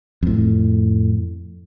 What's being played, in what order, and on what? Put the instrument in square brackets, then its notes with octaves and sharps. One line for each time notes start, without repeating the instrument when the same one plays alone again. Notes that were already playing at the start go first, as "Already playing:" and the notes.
[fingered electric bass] F2 A2